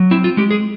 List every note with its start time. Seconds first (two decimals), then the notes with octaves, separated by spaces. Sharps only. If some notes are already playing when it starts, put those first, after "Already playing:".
Already playing: F#3
0.11 C4 E4
0.24 F4
0.37 G#3 G4
0.51 G#4